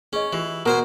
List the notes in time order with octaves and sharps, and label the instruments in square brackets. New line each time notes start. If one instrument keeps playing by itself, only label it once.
[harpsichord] C#4 [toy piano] G#4 D#5
[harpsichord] E3 [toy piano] F4 G4
[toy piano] B5
[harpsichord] B2 C5 G#5 [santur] A#4